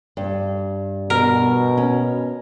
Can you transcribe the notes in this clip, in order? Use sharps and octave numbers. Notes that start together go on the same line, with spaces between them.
G2
B2 A#4
C#4